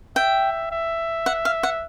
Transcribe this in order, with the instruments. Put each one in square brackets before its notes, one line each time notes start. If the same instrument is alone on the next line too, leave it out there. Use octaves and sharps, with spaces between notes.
[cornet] E5 [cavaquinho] G5
[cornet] E5
[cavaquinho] F#5
F5
F#5